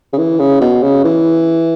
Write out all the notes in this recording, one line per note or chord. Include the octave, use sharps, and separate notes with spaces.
C#3
E3
C#3
B2
C#3
E3